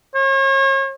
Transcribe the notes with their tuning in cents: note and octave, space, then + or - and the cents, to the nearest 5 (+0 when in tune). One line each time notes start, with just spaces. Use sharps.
C#5 -40